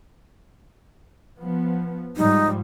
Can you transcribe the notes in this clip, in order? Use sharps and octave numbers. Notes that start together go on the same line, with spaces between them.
F3 B3
G#2 F3 G3 D#4